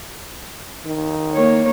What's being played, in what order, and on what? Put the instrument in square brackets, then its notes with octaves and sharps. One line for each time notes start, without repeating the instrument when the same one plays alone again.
[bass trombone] D#3
[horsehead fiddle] A#3 C#5